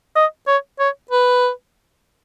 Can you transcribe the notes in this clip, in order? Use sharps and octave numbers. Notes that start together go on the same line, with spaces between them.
D#5
C#5
C#5
B4